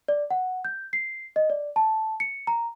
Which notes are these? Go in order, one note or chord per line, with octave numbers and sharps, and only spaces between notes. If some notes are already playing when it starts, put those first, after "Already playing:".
D5
F#5
G6
C7
D#5
D5
A5
C#7
A#5